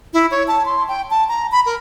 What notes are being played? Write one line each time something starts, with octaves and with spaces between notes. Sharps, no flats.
E4
C#5
A5
C6
G5
A5
A#5
B5
A#4